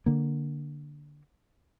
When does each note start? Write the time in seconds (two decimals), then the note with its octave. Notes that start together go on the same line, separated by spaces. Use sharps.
0.06 D3 A#3